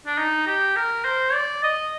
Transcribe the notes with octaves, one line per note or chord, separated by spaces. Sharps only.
D4
D#4
G4
A#4
C5
D5
D#5